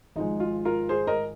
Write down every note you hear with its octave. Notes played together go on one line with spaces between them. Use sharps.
G#1 G#2 F3 G#3 D#4
F4
F4 A#4
G#4 C5
A#4 D#5